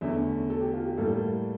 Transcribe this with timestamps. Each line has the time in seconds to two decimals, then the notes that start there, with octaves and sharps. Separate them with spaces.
0.01 E2 D3 A3 C#4 E5
0.50 A4
0.61 G4
0.74 F4
0.85 G4
0.97 A2 G3 A#3 A4